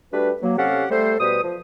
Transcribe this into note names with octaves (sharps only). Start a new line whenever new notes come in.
G3 A3 D4 F#4 B4
F#3 A#3
C3 C#4 G4 A4 F5 F#5
G3 A3 A4 C5
B2 G3 B4 C5 D#6
F3